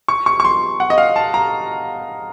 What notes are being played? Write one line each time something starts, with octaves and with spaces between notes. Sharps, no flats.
C#6
C#6
C#6
C6
F#5
D#5
F5
A5
A#5